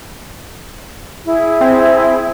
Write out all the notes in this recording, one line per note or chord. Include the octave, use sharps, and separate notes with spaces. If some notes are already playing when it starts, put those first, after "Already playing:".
E4 G#4
C4